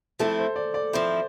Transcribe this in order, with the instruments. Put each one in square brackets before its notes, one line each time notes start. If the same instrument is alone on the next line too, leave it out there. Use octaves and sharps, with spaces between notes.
[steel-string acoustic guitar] F3 A3 C4 E4 [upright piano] A4
[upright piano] C5
D5
D5
[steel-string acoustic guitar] F3 C4 E4 [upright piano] C5